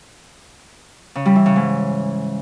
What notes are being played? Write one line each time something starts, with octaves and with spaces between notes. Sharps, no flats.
C#3
G3
E3
C#3
G#2